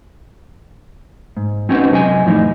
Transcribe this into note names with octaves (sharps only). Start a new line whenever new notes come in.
G#2
C4 C#4 D#4 F#4 B4 C5
F#2 C3 A4 D#5 G#5
F2 A2 E3 G3 D#4